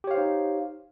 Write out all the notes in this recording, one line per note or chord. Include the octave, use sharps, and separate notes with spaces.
D#4 G4 C5 C#5 F5